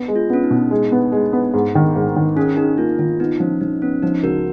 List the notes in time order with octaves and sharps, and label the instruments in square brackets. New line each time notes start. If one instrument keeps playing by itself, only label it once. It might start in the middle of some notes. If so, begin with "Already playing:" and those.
Already playing: [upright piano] B3
G#3
[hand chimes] F4
[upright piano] B3 [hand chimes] C#4
[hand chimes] D#4
[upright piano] B2
G#3
B3
G#3
B3
G#2
D#3
G#2
D#3
[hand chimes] C#4 [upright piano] G#4
[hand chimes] D#4 [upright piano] G#4
[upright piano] A#3 [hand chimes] F4
[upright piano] D#3 [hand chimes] F4
[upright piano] B3 [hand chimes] D#4
[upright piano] F3 [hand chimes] C#4
[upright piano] F3 [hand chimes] D#4
[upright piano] B3 [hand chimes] C#4
[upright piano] F3 [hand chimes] D#4
[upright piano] C#2 [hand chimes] F#4 A#4